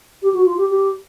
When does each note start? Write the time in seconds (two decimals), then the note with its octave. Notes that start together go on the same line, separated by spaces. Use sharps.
0.22 G4
0.34 F#4
0.46 F4
0.57 G4
0.69 G4